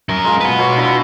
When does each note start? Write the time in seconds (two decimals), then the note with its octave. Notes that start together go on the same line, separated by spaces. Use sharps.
0.09 F#2 A#4
0.24 G#3 F4
0.41 F#4 B4
0.59 B2 C#5 A#5
0.77 D4 E4 A#5